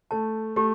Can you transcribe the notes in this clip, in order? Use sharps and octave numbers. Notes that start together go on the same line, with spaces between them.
A3 A5
A3 G4